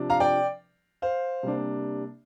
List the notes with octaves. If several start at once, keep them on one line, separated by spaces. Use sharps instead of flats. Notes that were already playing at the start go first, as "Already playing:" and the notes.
Already playing: C3 F3 D4
F5 A#5
D5 G5
C5 F5
C3 G3 A#3 D4